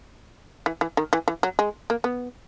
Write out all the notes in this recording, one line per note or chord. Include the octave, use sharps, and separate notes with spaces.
E3
E3
D#3
E3
E3
F#3
G#3
A#3
B3